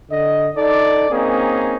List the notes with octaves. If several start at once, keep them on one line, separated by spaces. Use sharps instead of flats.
D3 D#5
D#4 A4 D5
A#3 C4 C#4 D#4 G#4